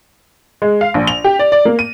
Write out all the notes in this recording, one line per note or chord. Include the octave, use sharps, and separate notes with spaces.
G#3
F5
A#1
F7
G4
D5
D5
A#3
D#7